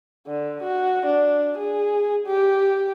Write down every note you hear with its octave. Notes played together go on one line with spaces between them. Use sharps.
D3
F#4
D4
G#4
G4